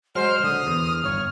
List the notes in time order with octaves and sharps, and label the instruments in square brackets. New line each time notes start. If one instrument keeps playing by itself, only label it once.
[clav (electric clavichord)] F#3 G#3 [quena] C5 [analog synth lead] F6
[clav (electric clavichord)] D3 [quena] D#6
[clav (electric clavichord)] E2
[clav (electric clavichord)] G1 [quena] C#5